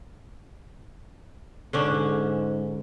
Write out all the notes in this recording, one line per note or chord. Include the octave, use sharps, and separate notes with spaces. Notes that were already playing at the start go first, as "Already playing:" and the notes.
G#2 D3 C#4 D4